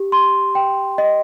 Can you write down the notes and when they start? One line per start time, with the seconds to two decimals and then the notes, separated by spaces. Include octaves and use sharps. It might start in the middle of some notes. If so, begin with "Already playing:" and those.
Already playing: G4
0.12 C6
0.55 G5
0.98 D#5